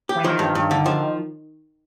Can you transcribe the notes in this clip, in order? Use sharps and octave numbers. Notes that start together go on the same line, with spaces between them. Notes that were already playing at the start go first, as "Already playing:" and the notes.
G4
E3
D#3 F3
G2
G2
D3
F3